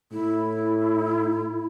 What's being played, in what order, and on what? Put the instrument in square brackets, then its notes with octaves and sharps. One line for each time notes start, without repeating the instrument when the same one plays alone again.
[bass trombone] A2 [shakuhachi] E4